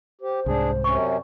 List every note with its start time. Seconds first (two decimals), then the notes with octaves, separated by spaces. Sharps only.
0.21 G4 C5
0.46 C2 G#2 D4 G#4
0.84 F#2 C3 C#4 C#6
1.01 D5